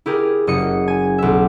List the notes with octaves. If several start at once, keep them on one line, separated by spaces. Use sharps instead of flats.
E4 G4 G#4 A#4
F#1 D#5 C#7
G#5
B1 E5